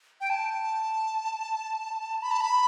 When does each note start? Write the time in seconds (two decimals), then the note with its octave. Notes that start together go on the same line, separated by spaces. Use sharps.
0.21 G5
0.30 A5
2.22 B5
2.31 A5
2.41 B5